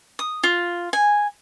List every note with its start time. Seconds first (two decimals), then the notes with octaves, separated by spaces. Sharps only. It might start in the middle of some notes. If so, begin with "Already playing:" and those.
0.19 D#6
0.43 F4
0.93 G#5